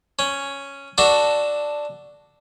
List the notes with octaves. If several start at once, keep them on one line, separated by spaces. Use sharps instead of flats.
C#4
D4 F#4 A4